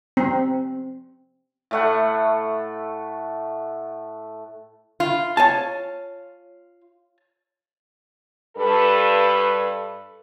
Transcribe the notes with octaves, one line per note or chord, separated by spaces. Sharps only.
C4
A2 A3 F#5
F4
C#5 G#5 A5
G2 A4 B4